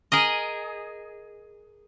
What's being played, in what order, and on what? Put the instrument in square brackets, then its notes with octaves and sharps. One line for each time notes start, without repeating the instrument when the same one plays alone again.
[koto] G#4 A#4 D#5